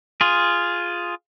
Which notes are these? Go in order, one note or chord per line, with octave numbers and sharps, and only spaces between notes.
F4 G#4